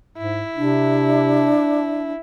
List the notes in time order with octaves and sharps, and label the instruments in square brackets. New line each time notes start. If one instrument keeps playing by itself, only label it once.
[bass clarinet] G#2 [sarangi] E4
[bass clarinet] C3 [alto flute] D4